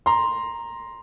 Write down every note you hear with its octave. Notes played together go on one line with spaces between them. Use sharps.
A#5 C6